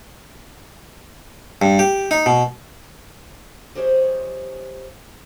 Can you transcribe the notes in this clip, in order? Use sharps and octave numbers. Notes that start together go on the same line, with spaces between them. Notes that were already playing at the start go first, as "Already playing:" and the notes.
G2
G4
D#4
B2
F3 G4 G#4 C5 C#5 D#5